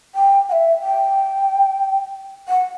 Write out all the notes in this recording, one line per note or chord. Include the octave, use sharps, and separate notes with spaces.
G5
F#5
E5
G5
F#5